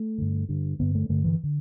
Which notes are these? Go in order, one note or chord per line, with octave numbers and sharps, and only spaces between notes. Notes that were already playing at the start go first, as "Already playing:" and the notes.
Already playing: A3
G2 D3
G2 D3
G2 D3 B3
A3
G2 D3 A3
E3
D3